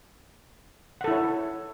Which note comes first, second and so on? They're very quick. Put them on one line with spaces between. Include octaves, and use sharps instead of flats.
F#5 A4 E4 C#5